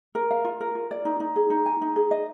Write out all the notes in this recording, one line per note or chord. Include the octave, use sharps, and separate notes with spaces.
A#4
F5
F4
A#4
F4
D5
D#4
D#4
G#4
D#4
G#5
D#4
G#4
D#5